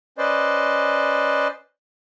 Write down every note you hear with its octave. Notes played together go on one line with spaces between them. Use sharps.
C#4 B4 C5 D5 D#5